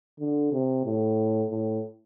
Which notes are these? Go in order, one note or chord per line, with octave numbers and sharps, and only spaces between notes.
D3
C3
A2
A2